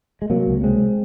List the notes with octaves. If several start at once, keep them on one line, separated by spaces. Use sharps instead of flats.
G#3
C3 F#3 A#3
C#2
C3 G#3 C4